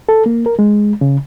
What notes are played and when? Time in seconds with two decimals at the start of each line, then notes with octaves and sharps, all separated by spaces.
0.09 A4
0.26 A#3
0.46 A#4
0.59 G#3
1.01 C#3